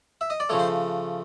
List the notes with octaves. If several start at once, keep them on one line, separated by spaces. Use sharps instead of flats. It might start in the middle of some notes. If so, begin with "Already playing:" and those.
E5
D#5
D5
C#3 F3 A3 C#5
C5